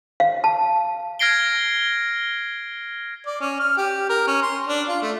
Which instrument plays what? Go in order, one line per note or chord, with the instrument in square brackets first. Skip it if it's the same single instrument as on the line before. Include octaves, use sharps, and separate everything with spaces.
[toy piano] F5
A5
[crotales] F6 G#6 A#6 C7 D7 G7
[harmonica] D5
C#4
F6
G4
A#4
C#4
C6
D4
F4
A3